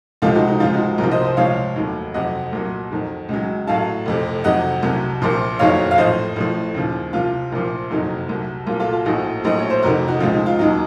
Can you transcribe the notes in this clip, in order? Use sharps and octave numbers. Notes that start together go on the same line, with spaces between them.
C#2 C3 F3 F4 A4
D#4 F#4
D#4
C#2 C#3 F3 F4
D#4 F#4
C2 C3 F3 F#4 A#4
C5 D#5
C5 D#5
C#2 C3 F3 C#5 F5
F1 D#2 D#3 F#3
F2 C3 F#3 D#5 F#5
C2 A#2 F#3
F2 D#3 F#3
C#2 C#3 F#3
A1 A2 F#3 F5 A5
F1 F2 C3
F2 C3 D#3 F#3 D#5 F#5
C2 C3 F#3
A#1 A#2 F3
F#1 F2 D#3 F#3 C#5 F5
F5
A1 A2 F3 C5 D#5
A1 A2 F3
D#2 C#3 F3
C2 C3 F3 F4
A#1 A#2 F3
F#1 F2 C3 D#3 F#3 D#4
C2 C3 F#3
C2 A#2 F#3 F4
F4 A4
F4
A#1 A2 F3 D#4 F#4
A#1 A2 F#3 D#5
C#5
C5
F1 F2 C3 D#3 F#4 A#4
D#4 F#4
C#2 C#3 F3 F4
D#4
F4
D#2 D#3 F#3 D#4